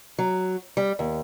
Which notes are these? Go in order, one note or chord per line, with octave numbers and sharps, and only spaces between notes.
F#3
G3
D#2